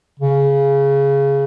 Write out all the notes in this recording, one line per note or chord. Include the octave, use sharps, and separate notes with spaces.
C#3